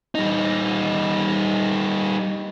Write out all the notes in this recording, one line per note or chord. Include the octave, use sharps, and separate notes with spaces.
G3 D#4